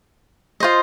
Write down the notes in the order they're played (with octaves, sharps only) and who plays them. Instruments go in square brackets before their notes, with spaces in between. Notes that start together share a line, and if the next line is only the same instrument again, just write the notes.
[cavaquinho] F4 C5 D#5